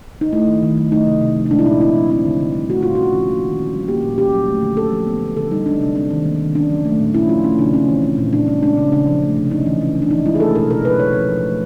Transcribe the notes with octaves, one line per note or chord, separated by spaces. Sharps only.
D#4
A3 E4
D#3
D#3
F#3
A3 D#4
C3
C3
F3
D#4
G#3 D4
E4
A#2 D#4
C4 E4
F3
C4 E4
D3
D3
G3
A3 F#4
A#2 F4
C#4 F#4
F3
A#3
D#3
C#4
G3
A#3 G4
A#2
C#4 G4
F#3
A3
D3
C#4 A4
F3
B3
D3
D3 A4
G3 D#4
G#3 D4
C3 D4
C4 D4
D#3
A#3
D#3
C#4 D4
F#3
A3
A#2
C#4 E4
F3 F4
A3 C#4
C#3 D4
C4 C#4
E3
C4
A#2
A#2 D4
G3 C#4
G#3 D4
C#3 C#4
C#3 D4
F3
A3
C3
C#4 D#4
E3
C#4
E3
D4
E3 D#4
G#3 E4
G#4
A3 A4
B2 A#4
B2 A#4
F#3 B4
C#4 C#5
F3
F3
A3